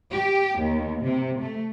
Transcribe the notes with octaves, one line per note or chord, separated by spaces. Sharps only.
G4
D#2
C3
A3